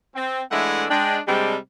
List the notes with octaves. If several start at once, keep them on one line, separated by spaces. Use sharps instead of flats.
C4
E3 G#3 A3 D4 E4 F#5
G#3 D4 G5
C3 G3 G#3 C4 D4